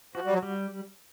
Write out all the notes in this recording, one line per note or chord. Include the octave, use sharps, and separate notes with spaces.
F3 F#4
G3
F#3
G3